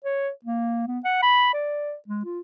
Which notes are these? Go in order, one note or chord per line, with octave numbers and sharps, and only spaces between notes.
C#5
A#3
B3
F#5
B5
D5
G#3
F4